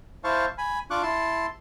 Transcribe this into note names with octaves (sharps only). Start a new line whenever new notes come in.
E4 C5 F5 A5 C#6
G#5 B5
D4 F4 C#6 D6 F#6
E4 A5 C6